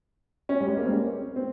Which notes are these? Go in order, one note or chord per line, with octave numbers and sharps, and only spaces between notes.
C#4
G3
G#3
A#3
C4
C#4
C4